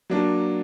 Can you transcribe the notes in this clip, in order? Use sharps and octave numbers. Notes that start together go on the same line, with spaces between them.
F#3 A#3 D4